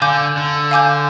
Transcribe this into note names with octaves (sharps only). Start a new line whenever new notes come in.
D3 F5 G#5 D6 G6
D3
F5 G#5 D6 G6